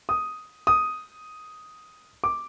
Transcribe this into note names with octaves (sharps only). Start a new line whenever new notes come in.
D#6
D#6
D6